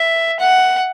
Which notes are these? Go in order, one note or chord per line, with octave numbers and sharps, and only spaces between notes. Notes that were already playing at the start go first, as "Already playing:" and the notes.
Already playing: E5
F#5